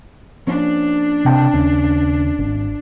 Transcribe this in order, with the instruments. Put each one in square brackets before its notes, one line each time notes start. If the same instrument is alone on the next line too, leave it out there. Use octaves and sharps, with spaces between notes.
[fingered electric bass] F3 A#3 C#4 [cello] D4
[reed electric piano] C3 G5 A5
[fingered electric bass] D#2 C#3 [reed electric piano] C#4
[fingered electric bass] G#1